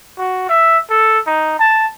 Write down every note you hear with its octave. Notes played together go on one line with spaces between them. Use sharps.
F#4
E5
A4
D#4
A5